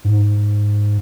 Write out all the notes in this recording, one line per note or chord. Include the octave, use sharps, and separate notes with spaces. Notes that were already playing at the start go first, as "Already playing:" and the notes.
G#2